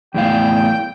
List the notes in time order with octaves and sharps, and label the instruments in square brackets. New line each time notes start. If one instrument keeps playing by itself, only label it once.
[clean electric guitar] E2 A2 F5 [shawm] G5